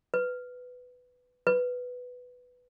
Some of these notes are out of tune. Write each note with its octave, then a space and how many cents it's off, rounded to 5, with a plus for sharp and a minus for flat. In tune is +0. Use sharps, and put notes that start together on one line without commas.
B4 +10
B4 +5